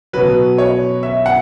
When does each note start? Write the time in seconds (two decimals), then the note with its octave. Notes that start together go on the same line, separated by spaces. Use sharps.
0.13 B2 F#3 B4
0.58 C#5
1.03 E5
1.26 F#5